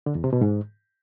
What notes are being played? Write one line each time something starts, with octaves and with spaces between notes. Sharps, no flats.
D3
E2
C3
B2
G#2